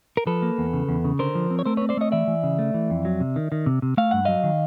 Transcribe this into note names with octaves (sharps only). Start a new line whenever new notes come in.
A#4
F3 A4 B4
A#3
E2
C#3
E2
C#3
D3 A#4 C5
F3
C4
C#5
A3 A#4 C5
C4 B4 C#5
C5 D5
A3 C#5 D#5
E3 D5 E5
E3
C#3
A3
E3
F2
F#3
C3
D#3
D#3
C3
C3
A3 F5
G2 F#5
F#3 D#5 F5
D#3